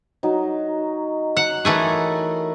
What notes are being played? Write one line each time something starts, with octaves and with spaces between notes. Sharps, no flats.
F#3 D#4
F#5
E3 A3 D#4 G#4 A#4